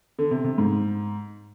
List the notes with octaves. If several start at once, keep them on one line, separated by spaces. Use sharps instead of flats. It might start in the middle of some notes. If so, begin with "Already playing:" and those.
D3
C3
C3
G#2